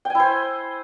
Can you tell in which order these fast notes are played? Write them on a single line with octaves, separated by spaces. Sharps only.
G5 G#5 E4 C5